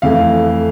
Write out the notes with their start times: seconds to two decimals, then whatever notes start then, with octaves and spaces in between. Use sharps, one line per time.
0.02 F2 E3 A3 F5